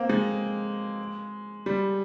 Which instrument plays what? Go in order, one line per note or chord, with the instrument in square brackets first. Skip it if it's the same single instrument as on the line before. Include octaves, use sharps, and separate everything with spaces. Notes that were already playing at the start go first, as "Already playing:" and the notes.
Already playing: [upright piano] A#3 C4
G#3
G3